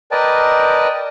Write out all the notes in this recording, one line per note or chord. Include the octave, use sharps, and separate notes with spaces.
A#4 B4 D5 D#5 G5 A5